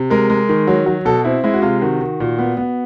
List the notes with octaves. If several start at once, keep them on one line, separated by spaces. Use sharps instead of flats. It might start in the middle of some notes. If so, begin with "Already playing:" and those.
Already playing: C3
G#3 A#4
G#3
D#3
F#3
F#3
B2 A4
C4 E4
G#3 E4
F#4
C3 F4
D#3 F#4
D#3
A#2
B3
B3